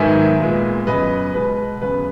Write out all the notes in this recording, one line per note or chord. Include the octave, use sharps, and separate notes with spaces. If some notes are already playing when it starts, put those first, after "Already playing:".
Already playing: G#2 D#3 F#3 B3 E5 G#5
A#2 G#3 B3
F#2 C#3 F#3 B3 B4 D#5
B2 G#3 B3 B4
F#2 C#3 F#3 B3 B4